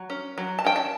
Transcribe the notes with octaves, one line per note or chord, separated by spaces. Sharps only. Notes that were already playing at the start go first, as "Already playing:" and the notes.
Already playing: F#3
C#4
F#3
A5
C#4 G5
A5